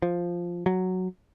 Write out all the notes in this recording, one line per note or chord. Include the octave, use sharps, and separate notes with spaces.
F3
F#3